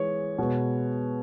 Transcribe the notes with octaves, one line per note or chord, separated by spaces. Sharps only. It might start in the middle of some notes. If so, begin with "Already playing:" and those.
Already playing: E3 G#3 B3 C#5
B2 G#3 B3